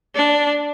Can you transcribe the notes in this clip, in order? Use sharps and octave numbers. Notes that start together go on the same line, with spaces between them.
D4